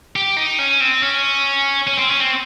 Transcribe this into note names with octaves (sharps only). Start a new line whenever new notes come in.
G4
D#4
C#4
C4
C#4
C#4
C4
C#4
C4